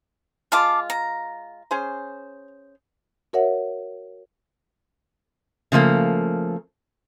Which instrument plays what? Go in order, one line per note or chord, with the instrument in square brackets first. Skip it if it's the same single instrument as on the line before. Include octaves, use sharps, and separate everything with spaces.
[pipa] G#3 F4 [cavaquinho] F5 A5 D6
[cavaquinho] A#5
[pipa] C#4 G#4 C5
[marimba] F#4 A#4 C#5 E5 F#5
[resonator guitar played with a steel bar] C#3 F3 A3 A#3